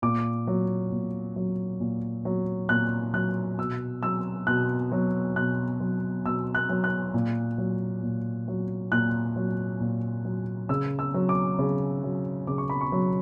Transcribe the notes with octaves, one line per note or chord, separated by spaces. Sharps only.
A#2 D6
F#3
A#2
F#3
A#2
F#3
A#2 F#6
F#3 F#6
B2 E6
F#3 E6
B2 F#6
F#3
B2 F#6
F#3
B2 E6
F#6
F#3
F#6
A#2
F#3
A#2
F#3
A#2 F#6
F#3
A#2
F#3
C#3 E6
E6
F#3
D6
C#3
F#3
C#3 D6
C#6
B5
C#6
F#3